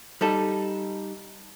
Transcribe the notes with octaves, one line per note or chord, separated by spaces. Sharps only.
G3 D#4 A4